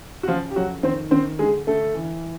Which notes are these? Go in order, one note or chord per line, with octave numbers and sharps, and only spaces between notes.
F#4
C#3 F3 F4
G4
F2 F#3 F#4
D#3 C4 C5
D#3 C4 C5
D3 G#3 G#4
D3 A3 A4
E3